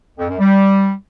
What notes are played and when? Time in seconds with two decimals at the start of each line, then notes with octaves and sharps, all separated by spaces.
0.18 F2
0.28 F#2
0.39 G3